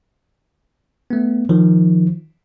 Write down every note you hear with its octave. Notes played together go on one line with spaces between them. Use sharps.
A3 B3
D#3 F3